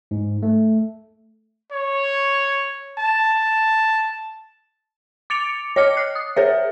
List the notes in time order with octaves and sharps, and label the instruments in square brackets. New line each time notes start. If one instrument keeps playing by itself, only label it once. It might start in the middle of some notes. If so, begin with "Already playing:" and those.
[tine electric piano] G#2
A3
[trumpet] C#5
A5
[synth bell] D6 A6 C#7 D7 F7
C#5 D#5 D6 F6 C#7
F#6 C7
D#6
G#4 A#4 C5 C#5 E5